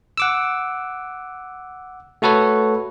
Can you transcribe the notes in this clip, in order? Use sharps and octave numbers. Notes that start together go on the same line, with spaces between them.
F#5 D6 E6
A3 F#4 A4 B4 C#5